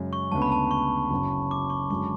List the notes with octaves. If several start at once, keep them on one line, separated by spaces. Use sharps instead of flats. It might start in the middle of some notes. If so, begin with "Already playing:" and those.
Already playing: F#2 C#3 G#3
C#6
D2 C#3 G#3 B3 A5
B5
A5
C#6
F#1 F#2 C#3
D6
C#6
F#2 D3 G#3 C#6